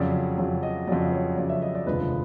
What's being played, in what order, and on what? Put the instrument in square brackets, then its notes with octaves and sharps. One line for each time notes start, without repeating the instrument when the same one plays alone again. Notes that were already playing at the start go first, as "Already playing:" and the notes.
Already playing: [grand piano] F2 C#3 F#3 D5
F2 C#3 F#3
D#5
F2 C#3 F#3 D5
C#5
F2 C#3 F#3 D5
E5
D#5
D5
F1 D#2 D3 F3 G#3 B4